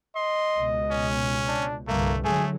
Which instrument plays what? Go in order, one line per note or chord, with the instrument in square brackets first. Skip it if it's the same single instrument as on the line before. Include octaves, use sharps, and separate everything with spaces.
[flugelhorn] D#5 [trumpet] C6
[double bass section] C#2 B2
[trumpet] C#4
[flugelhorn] D4
[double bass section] C2 G2 D3 [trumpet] A3 [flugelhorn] A#3
[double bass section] D3 F#3 G#3 [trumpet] A3 [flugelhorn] G#4